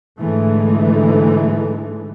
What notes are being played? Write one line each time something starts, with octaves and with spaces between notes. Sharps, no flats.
G#2 D3 E3 G#3 A3